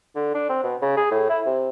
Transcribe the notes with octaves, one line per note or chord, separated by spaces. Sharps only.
D3
D4
C4
B2
C#3
G#4
A2
E4
C3